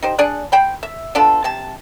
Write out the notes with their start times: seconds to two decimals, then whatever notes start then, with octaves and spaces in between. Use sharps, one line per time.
0.02 D#4 G4 C5
0.18 D4 G#4 D5 F#5
0.52 C5 G5 B5
0.83 E5
1.15 B3 D4 F4 A4
1.44 C3 A5